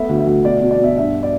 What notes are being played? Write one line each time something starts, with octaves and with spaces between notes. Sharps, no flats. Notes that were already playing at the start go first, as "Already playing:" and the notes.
Already playing: A3 B3 E5
D2
E5
D2
B2 D5
B2
D5
B2 E5
G2 E5
D5